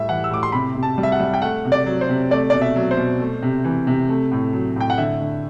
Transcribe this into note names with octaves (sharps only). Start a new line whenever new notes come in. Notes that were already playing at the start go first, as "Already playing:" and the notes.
Already playing: A2 G3 E5
E3 F#5
E6
A2 D6
C6
C3 B5
C3
A5
G3
E5
F#5
G3
G5
A3 F#5
C3
D5
F#3
C5
C3
A3 D5
B2 D5
E5
F#3
C5
B2
A3
C3
E3
C3
A3
A2
F#3
A2 G5
F#5
D3 E5
D3